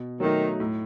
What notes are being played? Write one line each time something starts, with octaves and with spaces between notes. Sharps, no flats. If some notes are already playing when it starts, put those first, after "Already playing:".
Already playing: B2
D#3 F#3 A3 D#4
A2